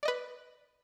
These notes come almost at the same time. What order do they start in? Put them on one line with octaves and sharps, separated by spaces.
D5 D#5 B4